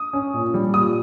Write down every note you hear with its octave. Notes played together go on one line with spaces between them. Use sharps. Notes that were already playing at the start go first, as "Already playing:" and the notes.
Already playing: D#6
C#4
A#2
G3
A#2 D#6